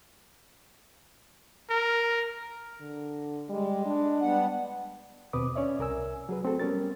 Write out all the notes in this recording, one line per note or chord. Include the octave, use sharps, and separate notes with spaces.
A#4
D3
G3 G#3
D4
G3 B3 F#5
D#2 B2 C4 B4 D6 D#6
C#4 C#5 D5 E5
C2 A#4 G#5 E6
F#3 G#4 B4
A3 C4 F#4 A4
G3 B3 C#4 A#4 A6